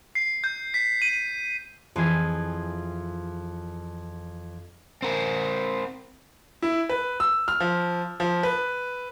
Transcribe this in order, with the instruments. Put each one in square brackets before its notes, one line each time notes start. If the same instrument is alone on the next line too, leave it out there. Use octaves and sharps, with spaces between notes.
[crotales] C7
G6
B6
D#7
[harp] F2 E3 F4 G#4 G#6
[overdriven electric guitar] C4 A#4
[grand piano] E4
B4
E6
F6
F3
F3
B4